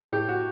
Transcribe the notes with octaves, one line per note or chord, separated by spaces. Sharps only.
A2 G4
F#4